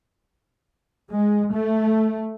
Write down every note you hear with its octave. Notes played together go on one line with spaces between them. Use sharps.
G#3
A3